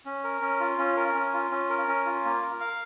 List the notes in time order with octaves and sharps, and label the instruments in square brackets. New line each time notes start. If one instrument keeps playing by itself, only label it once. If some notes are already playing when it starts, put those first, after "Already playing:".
[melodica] C#4
A#4
C#4
F4
C#4
A#4
C#4
F4
C#4
A#4
C#4
F4
A#3
A#4
F5